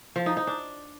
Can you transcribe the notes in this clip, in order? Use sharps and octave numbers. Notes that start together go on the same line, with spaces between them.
F3
D#4
D#4
D4